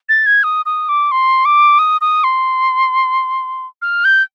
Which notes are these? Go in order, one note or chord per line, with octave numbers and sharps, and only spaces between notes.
A6
G#6
D#6
D#6
D6
C6
D6
D#6
D#6
C6
F6
G6